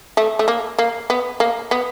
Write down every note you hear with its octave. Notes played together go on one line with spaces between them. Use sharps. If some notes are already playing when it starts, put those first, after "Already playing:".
A3
A3
A#3
A#3
B3
A#3
B3